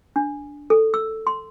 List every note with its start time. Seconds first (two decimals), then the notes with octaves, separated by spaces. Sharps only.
0.16 D4
0.70 A4
0.94 E6
1.27 C6